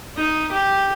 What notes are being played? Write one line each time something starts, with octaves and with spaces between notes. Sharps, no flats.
D#4
G4